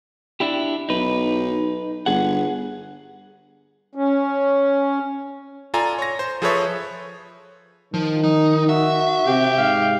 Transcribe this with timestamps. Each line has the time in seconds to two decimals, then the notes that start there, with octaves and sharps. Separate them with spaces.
0.40 D4 E4 G4
0.89 B1 D#4 B4
2.06 G1 G#4 F#5
3.95 C#4
5.74 F4 A4 D5 G#5 A#5
5.98 C#5 A#6
6.19 C5
6.42 F3 G#4 A4 B4 C#5 E5
7.94 D#3 F3
8.24 D#4 D#5
8.69 F#4 E5
9.27 C3 G4
9.58 G#2 F5